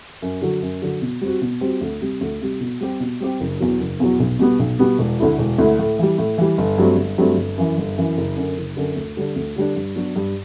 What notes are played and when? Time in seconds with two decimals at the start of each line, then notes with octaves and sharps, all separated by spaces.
0.22 F#2
0.42 D3 F#3
0.62 F#2
0.82 D3 F#3
1.02 B2
1.21 G3 C4 F#4
1.42 B2
1.61 G3 C4 F#4
1.81 D2
2.01 C3 G3
2.21 D2
2.41 C3 G3
2.61 B2
2.81 G3 C4 G4
3.00 B2
3.20 G3 C4 G4
3.40 F#1
3.60 E2 B2 F#3
3.80 F#1
4.00 E2 B2 F#3
4.20 B1
4.39 B2 G3 B3
4.59 B1
4.79 B2 G3 B3
4.99 E1
5.20 D2 D3 A3 E4
5.39 E1
5.58 D2 D3 A3 E4
5.79 A2
5.99 E3 G3
6.18 A2
6.38 E3 G3
6.58 G1
6.78 G2 F#3 A3 C4
6.97 G1
7.18 G2 F#3 A3 C4
7.37 G1
7.57 F#2 E3
7.77 G1
7.97 F#2 E3
8.17 F#1
8.37 F#2 D3
8.57 F#1
8.77 F#2 D3
8.96 D2
9.17 D3 G3 D4
9.36 D2
9.56 D3 G3 D4
9.76 G2
9.96 F#3 B3 D4 F#4
10.16 G2